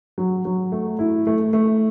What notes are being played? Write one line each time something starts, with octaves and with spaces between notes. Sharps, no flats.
F#3
F#3
A3
E4
A3
A3